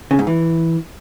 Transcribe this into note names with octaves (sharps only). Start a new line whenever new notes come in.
C#3
G#2
E3